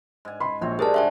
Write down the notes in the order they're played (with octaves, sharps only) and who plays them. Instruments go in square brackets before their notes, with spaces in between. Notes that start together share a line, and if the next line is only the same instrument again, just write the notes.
[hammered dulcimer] G#2 G#5
[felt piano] B5 C6
[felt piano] A#1 [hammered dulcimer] C4 F#4 C#5
[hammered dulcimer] D4 [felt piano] G4 G#4 A#4 [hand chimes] C5 A5
[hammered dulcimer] G2 [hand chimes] E5 F#5 G#5